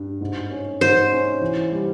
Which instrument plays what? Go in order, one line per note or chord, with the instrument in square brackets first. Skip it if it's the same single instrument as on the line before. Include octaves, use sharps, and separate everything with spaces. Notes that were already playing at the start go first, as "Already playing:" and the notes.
Already playing: [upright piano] G2
G#2
C#4
[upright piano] G#2 [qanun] C5
[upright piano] C#4
E3
G3